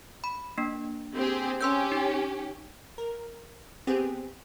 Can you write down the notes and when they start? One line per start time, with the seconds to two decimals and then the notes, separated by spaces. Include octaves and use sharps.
0.24 B5
0.58 A#3 D4
1.16 C4 G4 G#4
1.61 C#4 G4 C6 E6 G6
1.92 D#4
2.98 A#4
3.87 B3 C4 G4 G#4